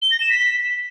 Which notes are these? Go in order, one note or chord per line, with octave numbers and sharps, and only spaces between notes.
G7
A#6
E7
B6